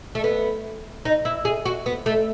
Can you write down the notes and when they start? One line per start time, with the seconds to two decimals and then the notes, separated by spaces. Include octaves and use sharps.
0.15 A3
0.24 B3
1.05 D#4
1.25 E4
1.45 G#4
1.66 F#4
1.86 B3
2.06 A3